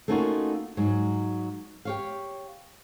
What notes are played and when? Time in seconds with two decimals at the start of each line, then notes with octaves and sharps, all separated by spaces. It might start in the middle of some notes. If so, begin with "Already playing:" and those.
0.08 A3 A#3 C#4 D#4 F4 F#4
0.77 G#2 F#3
1.85 G4 C#5 F5